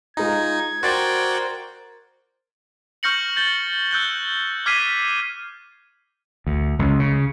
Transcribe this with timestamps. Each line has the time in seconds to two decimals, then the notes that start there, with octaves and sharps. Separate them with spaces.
0.17 G#3 D#4 F4 A#5 G#6
0.83 F#4 A#4 C5 D5 G5 C6 A6 D7
3.03 C#6 F6 G6 A#6 C#7 F#7
3.36 G6 A6 G7
3.91 E6 F#6 G6 G7
4.66 D6 F6 G#6 B6 C7 D#7
6.47 D2
6.79 C#2
6.99 C#3